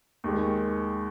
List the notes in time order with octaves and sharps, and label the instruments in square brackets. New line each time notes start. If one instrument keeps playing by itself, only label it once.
[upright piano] D#2 D#3 G#3